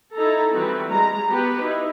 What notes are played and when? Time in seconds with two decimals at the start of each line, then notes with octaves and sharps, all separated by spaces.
0.14 D#4 E4 A4 A#5
0.52 E3 G3 C4 F#4 B4
0.89 G3 G#3 A#5
1.28 B3 F#4 G4 B4
1.61 D#4 E4